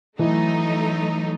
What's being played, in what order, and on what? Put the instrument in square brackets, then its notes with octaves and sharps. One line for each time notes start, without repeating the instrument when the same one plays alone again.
[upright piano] E3 [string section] F#3 A3 D#4